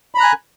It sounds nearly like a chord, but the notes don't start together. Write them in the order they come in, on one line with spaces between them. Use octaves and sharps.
B5 A#5 F#6 G#5